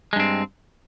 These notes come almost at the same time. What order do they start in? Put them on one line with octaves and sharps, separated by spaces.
G#3 G2 C4